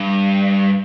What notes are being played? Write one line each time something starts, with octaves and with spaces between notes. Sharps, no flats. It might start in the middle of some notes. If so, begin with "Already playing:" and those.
Already playing: G2